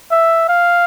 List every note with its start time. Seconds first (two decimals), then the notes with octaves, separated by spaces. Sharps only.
0.11 E5
0.49 F5